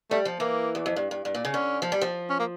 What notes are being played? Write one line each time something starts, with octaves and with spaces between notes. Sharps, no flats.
G3 A3
F3
E3 A#3
E2
F2
G2
G2
G2
A#2
C#3
D3 C#4
F3
G3
F3
C#4
A#3